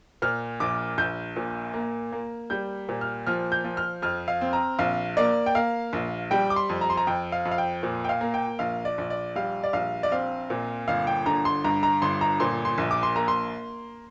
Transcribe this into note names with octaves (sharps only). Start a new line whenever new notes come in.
A#2 F6
A#1 D6
A#1 G6
A#2
A#3
A#3
G3 G6
A#2
F6
F3 F6
G6
F3
F6
F2 F6
F5
C4
A#5
A#1 F5
A#3 D5
G5
A#3 F5
A#1
G3 G5
D6
C6
F2
A#5
C6
A#5
F2 G5
F5
F2
F5
G5
A#2
G5
F5
A#3
G5
A#1 F5
D5
A#1
D5
G3 F5
D5
A#1 F5
D5
C4 F5
A#2
G1 F5
G5
D3 A#5
C6
G2 A#5
A#5
G1 C6
A#5
A#2 C6
C6
A#1
D6
C6
A#3 A#5
C6